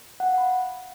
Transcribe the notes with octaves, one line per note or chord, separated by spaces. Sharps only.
F#5
F5
B5